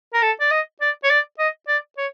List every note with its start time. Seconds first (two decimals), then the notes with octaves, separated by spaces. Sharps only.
0.14 A#4
0.22 A4
0.40 D5
0.51 D#5
0.81 D5
1.03 C#5
1.10 D5
1.39 D#5
1.68 D5
1.97 C#5